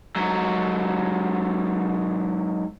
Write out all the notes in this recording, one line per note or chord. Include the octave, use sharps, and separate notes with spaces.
G#2 F#3